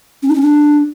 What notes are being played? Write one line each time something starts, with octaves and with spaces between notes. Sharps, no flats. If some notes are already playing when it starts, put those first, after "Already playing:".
C#4
D#4
C#4
D4